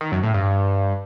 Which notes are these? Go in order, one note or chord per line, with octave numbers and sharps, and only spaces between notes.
D#3
F#2
A2
G2